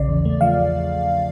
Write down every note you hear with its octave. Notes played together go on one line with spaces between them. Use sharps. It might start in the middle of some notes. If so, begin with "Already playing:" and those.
Already playing: A#1 C#3 D5
E2
A3
F3 F5